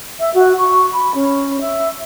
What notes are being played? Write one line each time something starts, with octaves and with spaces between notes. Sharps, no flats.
E5
F#4
C#6
B5
C#4
E5